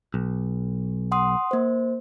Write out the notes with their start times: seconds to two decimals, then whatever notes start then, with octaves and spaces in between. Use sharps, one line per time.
0.14 B1
1.12 F#5 C6 D#6
1.51 A#3 C5